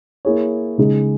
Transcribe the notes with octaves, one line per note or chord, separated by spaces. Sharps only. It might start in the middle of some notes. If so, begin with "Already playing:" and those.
A#3 E4 G#4 C#5
C#3 G#3 D#4 G#4